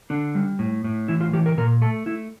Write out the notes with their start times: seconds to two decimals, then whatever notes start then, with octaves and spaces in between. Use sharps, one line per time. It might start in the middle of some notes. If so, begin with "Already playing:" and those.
0.10 D3 D4
0.35 G3
0.59 A2
0.84 A2
1.08 E3 E4
1.21 F4
1.33 E3 G4
1.46 A#4
1.57 A#2 A#4
1.81 A3 A4
2.06 A3 E4